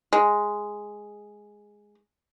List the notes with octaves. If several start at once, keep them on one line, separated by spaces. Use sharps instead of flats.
G#3